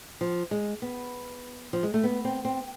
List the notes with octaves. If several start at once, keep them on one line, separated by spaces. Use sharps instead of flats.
F3
G#3
B3
F3
G#3
A3
B3
C4
C4